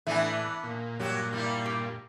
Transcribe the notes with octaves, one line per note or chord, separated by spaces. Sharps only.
A2 E3 B3 D4 E5 G#5
A#2
G2 A#2 F#3 G4
G3 A#3 E4
G4